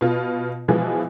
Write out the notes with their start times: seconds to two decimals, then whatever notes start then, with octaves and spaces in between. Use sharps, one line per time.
0.01 B2 F4
0.68 B2 E3 F3 G#3